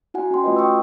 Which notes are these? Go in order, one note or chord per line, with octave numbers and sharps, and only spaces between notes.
E4 F#4 F#5 G#5
C#4 F#4 G5 C6
A3 F4 B4 D#5
F#5 G5 C#6 D#6 E6